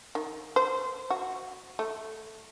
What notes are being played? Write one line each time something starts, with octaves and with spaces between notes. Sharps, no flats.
D#3
C5
F#4
A3